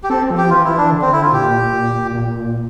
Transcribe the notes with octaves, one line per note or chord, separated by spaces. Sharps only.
G4
C4 A4
F3
G4
E3 F4
E4
D4
D3
C4
E4
F4
A#2 G4
A#2